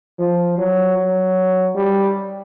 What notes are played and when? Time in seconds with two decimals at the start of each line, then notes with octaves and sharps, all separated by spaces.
0.19 F3
0.58 F#3
0.97 F#3
1.75 G3